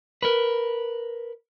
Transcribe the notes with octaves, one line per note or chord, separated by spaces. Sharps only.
A#4 B4